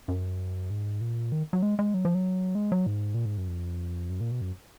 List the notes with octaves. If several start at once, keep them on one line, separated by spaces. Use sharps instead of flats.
F#2
G#2
A#2
D#3
F#3
G#3
G#3
F#3
F3
F#3
G#3
F#3
G#2
A#2
G#2
F#2
F2
F#2
A#2
B2
F#2